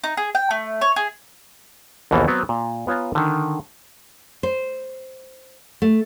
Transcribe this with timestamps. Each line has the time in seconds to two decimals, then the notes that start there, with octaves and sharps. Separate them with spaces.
0.04 D#4
0.17 G#4
0.35 G5
0.51 A3
0.81 C#5
0.96 G#4
2.11 A#1 D#2 B2 E3 A#3 A4
2.28 F#3 B3 C4
2.49 A#2
2.87 B3 F4 C#5 G#5 A#5
3.15 D3 D#3
4.43 C5
5.82 A3